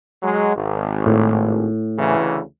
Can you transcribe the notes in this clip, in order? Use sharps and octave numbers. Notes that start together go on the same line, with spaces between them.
F#3 G#3
G#1
A2
D2 C#3 E3